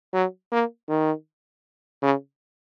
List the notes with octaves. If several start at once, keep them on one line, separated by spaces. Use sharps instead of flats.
F#3
A#3
D#3
C#3